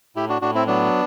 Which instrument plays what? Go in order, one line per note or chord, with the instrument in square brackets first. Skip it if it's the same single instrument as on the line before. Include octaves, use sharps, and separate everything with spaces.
[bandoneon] A2 E4 G4
D4 F#4
A2 D4 F#4
C4 E4
F#3 B3 D4